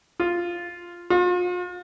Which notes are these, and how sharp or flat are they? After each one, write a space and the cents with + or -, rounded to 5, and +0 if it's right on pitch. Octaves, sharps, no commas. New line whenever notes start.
F4 -5
F4 +40